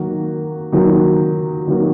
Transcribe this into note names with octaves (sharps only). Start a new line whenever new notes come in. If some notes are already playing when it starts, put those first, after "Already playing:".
Already playing: D#3 F#3 A#3 F#4
D#3 F#3 A#3 F#4
D#3 F#3 A#3 F#4